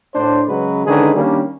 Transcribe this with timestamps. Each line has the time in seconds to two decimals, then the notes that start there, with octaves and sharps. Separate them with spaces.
0.15 A2 D4 C5
0.48 C#3 F#3 G#3 F#4 B4
0.86 D3 D#3 G#3 C#4 G#4 B4
1.15 D#3 G3 A#3 C#4 D4